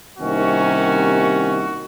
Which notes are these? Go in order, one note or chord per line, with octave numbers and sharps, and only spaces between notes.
C2 C3 D#3 A#3 C#4 F#4